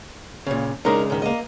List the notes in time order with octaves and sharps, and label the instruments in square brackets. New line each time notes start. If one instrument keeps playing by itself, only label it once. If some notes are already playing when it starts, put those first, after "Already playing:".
[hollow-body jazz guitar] A#2 C#3
[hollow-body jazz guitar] C#3 G#3 D4 [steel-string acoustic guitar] D#4 A#4
[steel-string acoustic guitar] G#2 D#3
A#3 D#5